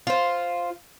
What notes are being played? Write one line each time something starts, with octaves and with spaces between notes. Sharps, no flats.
F4 C5